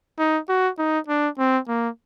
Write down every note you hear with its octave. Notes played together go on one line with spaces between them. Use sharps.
D#4
F#4
D#4
D4
C4
A#3